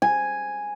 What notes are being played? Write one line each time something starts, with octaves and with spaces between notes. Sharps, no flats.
G#5